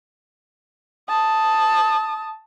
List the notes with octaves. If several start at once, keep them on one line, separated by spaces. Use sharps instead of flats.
A5 D#6